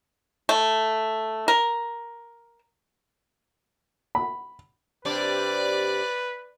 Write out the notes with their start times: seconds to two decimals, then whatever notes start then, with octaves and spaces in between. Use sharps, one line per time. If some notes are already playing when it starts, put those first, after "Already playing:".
0.49 A3
1.48 A#4
4.15 B5
5.05 C3 G3 D4 B4 D5